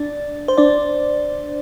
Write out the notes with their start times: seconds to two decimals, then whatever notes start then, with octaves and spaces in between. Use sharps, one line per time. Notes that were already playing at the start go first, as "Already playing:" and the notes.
Already playing: D4 D5
0.48 C5
0.58 D4 D5